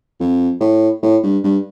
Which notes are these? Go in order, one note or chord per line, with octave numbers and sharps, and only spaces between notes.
F2
A2
A2
G2
G2